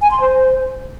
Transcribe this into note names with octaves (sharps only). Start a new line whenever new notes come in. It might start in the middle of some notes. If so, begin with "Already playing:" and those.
G#5
C6
C5